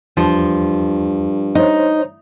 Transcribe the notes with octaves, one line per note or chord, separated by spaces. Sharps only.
E2 G2 F3
D#4 C5 C#5